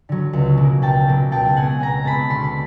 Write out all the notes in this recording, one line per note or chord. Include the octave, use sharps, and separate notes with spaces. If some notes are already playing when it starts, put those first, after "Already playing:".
D3 F#3
C#2
B2 F#3 A#3
C#2 G5 A5
B2 F#3 A#3
C#2 G5 A5
B2 G#3 C4 F#5 G#5
C#2 G#5 A#5
B2 G#3 C4 A5 B5
D2 C6
B5